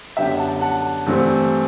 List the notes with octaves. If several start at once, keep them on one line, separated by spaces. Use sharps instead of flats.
F#2 D3 G3 B3 E5 G5
F#5 A5
F#5 A5
G2 E3 A3 C4